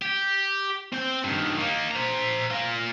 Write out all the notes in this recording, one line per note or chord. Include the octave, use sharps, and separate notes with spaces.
G4
C4 G5
G2 D#3
A#3 D#4
C5 A#5
F4 A#4